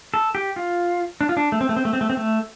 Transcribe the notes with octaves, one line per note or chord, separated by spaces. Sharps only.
A4
G4
F4
D4
F4
D4
A3
C4
A3
C4
A3
C4
A3
C4
A3